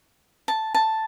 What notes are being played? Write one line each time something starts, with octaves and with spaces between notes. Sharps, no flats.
A5
A5